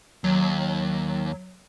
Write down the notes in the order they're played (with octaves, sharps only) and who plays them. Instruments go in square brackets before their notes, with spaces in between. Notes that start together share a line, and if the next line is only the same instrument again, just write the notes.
[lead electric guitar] D#2 [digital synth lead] F#3